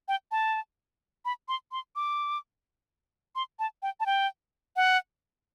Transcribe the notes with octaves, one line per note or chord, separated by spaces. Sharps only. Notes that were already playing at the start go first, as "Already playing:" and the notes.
G5
A5
B5
C6
C6
D6
C6
A5
G5
A5
G5
F#5